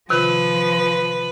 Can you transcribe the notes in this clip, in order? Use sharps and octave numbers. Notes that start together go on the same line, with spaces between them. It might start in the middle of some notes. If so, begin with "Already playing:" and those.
C3 D#3 F3 F4 B4